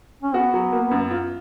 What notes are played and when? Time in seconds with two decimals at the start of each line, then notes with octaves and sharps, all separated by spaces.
0.23 C#4
0.34 B3 F#4
0.54 F#3
0.72 A#3
0.91 F#2
1.11 F4